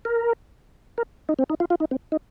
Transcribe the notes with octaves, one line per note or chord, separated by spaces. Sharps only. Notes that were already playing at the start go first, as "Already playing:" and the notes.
A#4
A#4
D#4
C4
D#4
F4
F4
D#4
C4
D#4